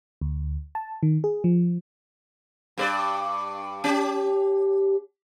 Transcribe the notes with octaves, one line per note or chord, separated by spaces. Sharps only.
D2
A5
D#3
G#4
F3
G2 A#4 D5
C#4 G4